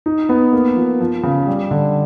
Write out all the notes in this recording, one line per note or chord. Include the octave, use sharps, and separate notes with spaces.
D#4
B3
A#3
F3
F3
C#3
G3
D3